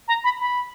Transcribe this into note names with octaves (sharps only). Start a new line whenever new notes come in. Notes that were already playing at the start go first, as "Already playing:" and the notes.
A#5
B5
B5